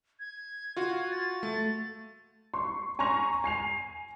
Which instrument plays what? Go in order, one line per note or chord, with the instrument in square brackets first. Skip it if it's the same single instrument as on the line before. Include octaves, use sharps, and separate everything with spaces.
[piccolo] G#6
[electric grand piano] F4 F#4
[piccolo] A6
[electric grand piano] A3
[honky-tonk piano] C6 C#6
G#5 A#5 C6 C#6 A#6 F7
G#5 C7 F7